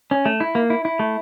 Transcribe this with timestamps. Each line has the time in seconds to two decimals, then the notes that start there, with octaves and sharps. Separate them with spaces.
0.11 C#4
0.25 A3
0.40 E4
0.55 A#3
0.70 E4
0.85 E4
0.99 A3